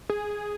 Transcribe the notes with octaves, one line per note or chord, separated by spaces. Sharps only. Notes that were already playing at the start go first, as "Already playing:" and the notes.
G#4